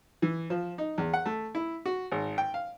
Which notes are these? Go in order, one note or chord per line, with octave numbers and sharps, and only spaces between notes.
E3
F3
D#4
E2
F#5
A3
E4
F#4
G#1
G5
F5